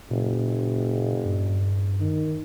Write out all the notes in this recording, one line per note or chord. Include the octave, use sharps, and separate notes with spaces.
F#1 A#2
G2
D#3